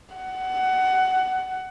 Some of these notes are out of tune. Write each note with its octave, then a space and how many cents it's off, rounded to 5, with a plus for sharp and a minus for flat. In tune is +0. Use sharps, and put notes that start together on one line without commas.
F#5 +20